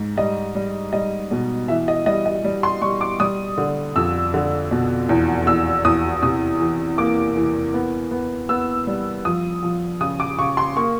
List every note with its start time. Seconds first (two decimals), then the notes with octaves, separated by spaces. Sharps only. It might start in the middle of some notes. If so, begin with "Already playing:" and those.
Already playing: G#2
0.17 G3 D#5
0.55 G3
0.93 G3 D#5
1.31 B2
1.68 E3 E5
1.88 D#5
2.06 G3 D#5
2.26 D#5
2.44 G3
2.63 C6
2.82 G3 C#6
3.01 D6
3.20 G3 D#6
3.58 D3
3.96 F2 E6
4.34 D3
4.71 B2
5.09 E2
5.47 E2 E6
5.84 E2 D#6
6.22 C3 D#6
6.60 E3
6.98 A#3 D6
7.36 E3
7.74 B3
8.11 B3
8.49 B3 E6
8.87 G3
9.25 F3 D#6
9.63 F3
10.01 C#3 D#6
10.20 D6
10.39 C#3 C#6
10.57 C6
10.76 A#3 C#6